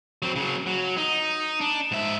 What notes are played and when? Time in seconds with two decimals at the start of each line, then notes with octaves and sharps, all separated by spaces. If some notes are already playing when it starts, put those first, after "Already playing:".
0.22 F#3 C4
0.36 C#3 F#3
0.67 F#3
0.97 D#4
1.61 D4
1.92 G#2 E5